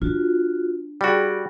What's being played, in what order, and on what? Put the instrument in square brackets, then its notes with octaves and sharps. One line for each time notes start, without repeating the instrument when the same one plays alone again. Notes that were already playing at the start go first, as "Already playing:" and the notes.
[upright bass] D4 [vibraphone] F4 F#4
[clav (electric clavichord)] G3 F#4 [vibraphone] G#4 D5 G5